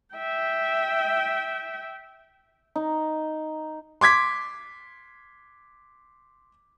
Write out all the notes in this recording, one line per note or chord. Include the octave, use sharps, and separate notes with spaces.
E5 G5
D#4
C6 D6 G#6 B6